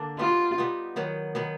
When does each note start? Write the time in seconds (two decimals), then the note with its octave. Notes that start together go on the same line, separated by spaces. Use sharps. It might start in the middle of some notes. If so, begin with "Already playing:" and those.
Already playing: D3 A#3 D4
0.19 G3 B3 D#4 F4
0.58 G3 B3 D#4
0.96 D#3 F#3 B3
1.35 D#3 F#3 B3